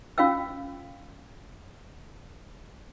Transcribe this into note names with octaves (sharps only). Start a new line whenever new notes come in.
C#4 F4 F5 G5 E6